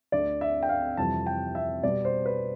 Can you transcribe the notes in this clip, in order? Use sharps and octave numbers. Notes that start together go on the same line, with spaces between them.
D2 D3 A3 D5
E5
G5
F5
F2 C3 E3 G3 A5
G5
E5
B2 G3 B3 D5
C5
B4